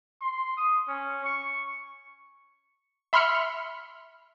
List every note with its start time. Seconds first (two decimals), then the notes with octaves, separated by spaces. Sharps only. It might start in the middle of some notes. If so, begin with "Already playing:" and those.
0.21 C6
0.57 D#6
0.88 C#4
1.24 C#6
3.13 E5 B5 C6 F6 B6 C#7